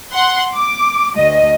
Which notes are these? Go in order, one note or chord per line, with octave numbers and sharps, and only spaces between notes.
F#5 C6
D6
D2 D#5